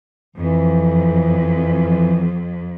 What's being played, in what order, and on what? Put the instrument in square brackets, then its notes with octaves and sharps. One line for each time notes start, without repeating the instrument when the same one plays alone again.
[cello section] F2 [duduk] E3